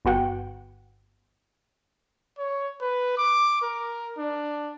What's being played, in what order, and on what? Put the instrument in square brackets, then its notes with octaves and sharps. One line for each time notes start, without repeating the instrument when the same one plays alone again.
[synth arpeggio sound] G1 B3 F#4 F#5 G5
[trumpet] C#5
B4
D6
A#4
D4